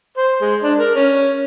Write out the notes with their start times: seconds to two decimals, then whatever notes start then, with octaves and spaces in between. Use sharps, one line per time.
0.18 C5
0.42 G#3
0.63 D4
0.79 A#4
0.95 C#4